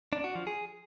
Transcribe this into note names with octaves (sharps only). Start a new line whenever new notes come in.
D4
F#4
F3
G#4